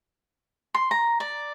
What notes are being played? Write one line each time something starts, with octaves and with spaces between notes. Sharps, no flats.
C6
A#5
D5